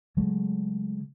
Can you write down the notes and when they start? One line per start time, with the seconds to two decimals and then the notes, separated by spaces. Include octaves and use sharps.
0.17 C#3 F#3 G#3 A3